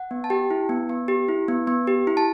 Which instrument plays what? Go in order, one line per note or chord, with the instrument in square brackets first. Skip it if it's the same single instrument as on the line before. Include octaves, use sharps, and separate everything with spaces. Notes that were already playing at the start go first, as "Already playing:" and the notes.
Already playing: [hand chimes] F#5
B3
A5
G4 G5
E4
B3
B3
G4
E4
B3
B3
G4
E4
A5